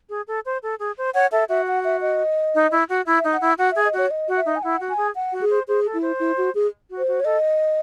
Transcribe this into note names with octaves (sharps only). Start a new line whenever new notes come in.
G#4
A4
C5
A4
G#4
C5
C#5 F#5
A4 E5
F#4 E5
F#5
E5
D#5
D#4
E4
F#4
E4 E5
D#4
F#5
E4
F#4 F#5
E5
G#4
D#5
F#4 C#5
D#5
F#4
E5
D#4
G#5
E4 F#5
F#4
G#5
G#4
F#5
F#4
G#4
C5
G#4 C5
A4
E4
C5
E4
F#4
G#4
F#4
C5
F#4
C#5
A4 D#5